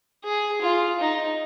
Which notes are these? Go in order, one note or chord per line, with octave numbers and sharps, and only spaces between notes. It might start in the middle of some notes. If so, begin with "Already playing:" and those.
G#4
F4
D#4